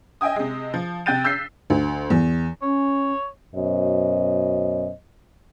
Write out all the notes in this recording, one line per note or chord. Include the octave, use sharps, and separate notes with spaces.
D#5 E5 G5 G#5 D#6
C3 G#3
F3
C3 G5 F#6 G6 A6 D#7
E6 G6 B6 C7
D2
E2
C#4 C#5
F#2 B2 C5 D#5